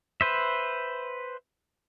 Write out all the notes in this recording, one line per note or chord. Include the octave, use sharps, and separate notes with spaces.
B4 C5 E5